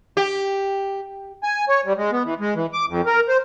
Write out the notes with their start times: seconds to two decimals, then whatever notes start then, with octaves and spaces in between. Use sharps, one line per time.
0.17 G4
1.44 G#5
1.69 C#5
1.86 G3
1.98 G#3
2.12 B3
2.25 E3
2.40 G#3
2.55 E3
2.73 D6
2.89 F2
3.06 A#4
3.29 C5